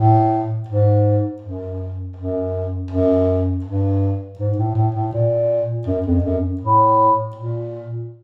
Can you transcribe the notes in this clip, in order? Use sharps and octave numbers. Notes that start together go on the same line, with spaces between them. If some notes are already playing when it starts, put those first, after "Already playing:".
Already playing: A2
G#2
F#2
F#2
F#2
G2
G#2
A2
A2
A2
A#2
F#2
F2
F#2
A2
A#2